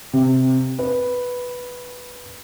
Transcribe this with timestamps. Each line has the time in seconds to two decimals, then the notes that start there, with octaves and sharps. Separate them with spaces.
0.13 C3
0.79 B4